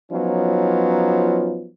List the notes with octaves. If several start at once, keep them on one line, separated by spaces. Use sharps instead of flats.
F3 F#3 B3 C#4 D#4 F4